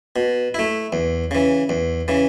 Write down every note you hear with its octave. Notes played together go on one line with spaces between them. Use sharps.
B2
A3 E4
E2
C#3 E3
E2
C#3 E3